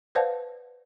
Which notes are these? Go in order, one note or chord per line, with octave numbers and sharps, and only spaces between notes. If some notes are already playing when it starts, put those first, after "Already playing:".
B4 C5 D5 F5 F#5 A5